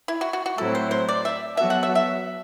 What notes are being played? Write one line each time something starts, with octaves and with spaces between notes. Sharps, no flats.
E4
F#4
F#4
F#4
A2 F#3 C4 E4 A4
C5
C5
D5
E5
F#3 B3 F#4 A4 E5
F#5
E5
E5